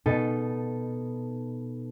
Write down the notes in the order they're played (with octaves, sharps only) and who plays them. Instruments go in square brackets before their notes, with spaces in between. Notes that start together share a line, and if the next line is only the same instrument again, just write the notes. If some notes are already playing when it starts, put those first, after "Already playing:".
[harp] B2 D#4 A4